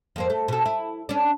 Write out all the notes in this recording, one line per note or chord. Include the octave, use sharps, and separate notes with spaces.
F2 A#3 C4
A3
B2 A4
E4
C#4 D4